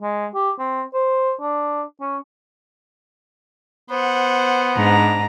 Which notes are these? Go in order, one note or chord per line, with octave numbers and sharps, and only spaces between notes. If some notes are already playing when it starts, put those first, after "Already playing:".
G#3
G4
C4
C5
D4
C#4
B3 C5 F#5
G#2 D4 A#5